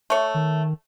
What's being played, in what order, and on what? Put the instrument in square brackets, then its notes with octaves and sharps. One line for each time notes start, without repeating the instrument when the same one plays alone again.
[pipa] A3 C#5
[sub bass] D#3